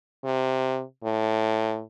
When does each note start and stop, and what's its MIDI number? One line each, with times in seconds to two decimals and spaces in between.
0.24 0.82 48
1.04 1.81 45